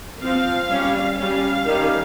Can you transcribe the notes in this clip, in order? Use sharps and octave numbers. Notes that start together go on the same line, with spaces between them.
F3 C4 F5
G3 C#4
G3 C#4 F5
D#3 G3 C#4